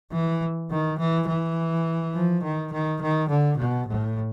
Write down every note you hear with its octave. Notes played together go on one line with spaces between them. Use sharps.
E3
D#3
E3
E3
F3
D#3
D#3
D#3
D3
B2
A2